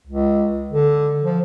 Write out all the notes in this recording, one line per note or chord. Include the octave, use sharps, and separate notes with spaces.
C#2
D3
F3